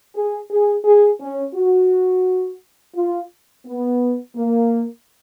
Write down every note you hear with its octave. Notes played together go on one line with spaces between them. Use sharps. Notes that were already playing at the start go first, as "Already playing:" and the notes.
G#4
G#4
G#4
C#4
F#4
F4
B3
A#3